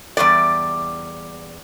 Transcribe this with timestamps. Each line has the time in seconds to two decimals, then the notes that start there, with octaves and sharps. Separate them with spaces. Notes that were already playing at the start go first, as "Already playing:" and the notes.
0.17 E2 G2 G3 D5